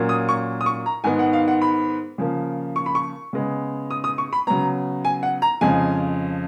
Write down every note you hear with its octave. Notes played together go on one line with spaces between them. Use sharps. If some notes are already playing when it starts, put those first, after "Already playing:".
Already playing: A#2 F#3 A#3 C#4
D#6
C#6
D#6
C#6
A#5
G#2 D#3 G#3 B3 G#5
F#5
F5
F#5
B5
C#3 F3 A#3
C#6
B5
C#6
C#3 G#3 B3
D#6
D#6
C#6
B5
C#3 F#3 B3 A#5
G#5
F#5
A#5
F2 C#3 F3 G#3 G#5